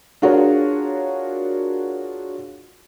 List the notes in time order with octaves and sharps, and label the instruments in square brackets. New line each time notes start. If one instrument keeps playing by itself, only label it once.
[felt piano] D4 F4 F#4 G#4 A#4 C#5